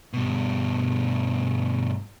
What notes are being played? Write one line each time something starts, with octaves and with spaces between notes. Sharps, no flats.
G2 B2